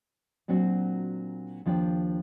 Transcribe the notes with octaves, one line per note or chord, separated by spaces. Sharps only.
A#2 F#3 C4 D4 F#4
D#2 F3 D4 D5 G5